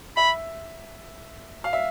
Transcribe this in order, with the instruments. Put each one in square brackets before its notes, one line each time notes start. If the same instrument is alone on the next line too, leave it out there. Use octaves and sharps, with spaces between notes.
[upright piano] E5 [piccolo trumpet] B5
[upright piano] F5
E5